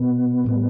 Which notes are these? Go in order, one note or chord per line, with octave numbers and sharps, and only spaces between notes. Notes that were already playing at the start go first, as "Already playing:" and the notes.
Already playing: B2 B3
A2 G3 B3